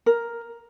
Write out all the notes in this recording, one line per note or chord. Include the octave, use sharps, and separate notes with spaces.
A#4